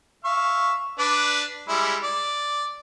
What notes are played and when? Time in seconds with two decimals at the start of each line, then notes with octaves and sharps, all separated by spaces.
0.25 E5 F5 C#6
0.99 D4 B4 D5
1.68 G3 G#3 E4
2.04 D5